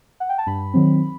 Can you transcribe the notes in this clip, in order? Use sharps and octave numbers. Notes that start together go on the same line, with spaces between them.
F#5
G5
A5
G2 B5
D#3 F#3 C4